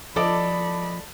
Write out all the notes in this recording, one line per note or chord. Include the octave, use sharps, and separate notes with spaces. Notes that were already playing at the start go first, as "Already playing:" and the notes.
F3 A4 D5 D#5 A5 B5 D6